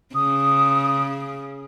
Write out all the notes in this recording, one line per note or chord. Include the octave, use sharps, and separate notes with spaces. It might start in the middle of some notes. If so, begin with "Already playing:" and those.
C#3 D#6